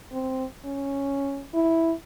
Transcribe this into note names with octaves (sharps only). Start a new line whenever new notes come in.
C4
C#4
E4